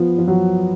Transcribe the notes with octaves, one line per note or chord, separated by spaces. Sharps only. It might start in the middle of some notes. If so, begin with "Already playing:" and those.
Already playing: F3 B3
F3
F#3